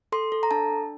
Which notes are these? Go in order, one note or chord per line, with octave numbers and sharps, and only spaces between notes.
A4 C6
A4
A#5
D4 A5
D4